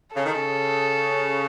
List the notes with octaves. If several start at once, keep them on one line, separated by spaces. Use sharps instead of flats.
C#3 A4
D#3
C#3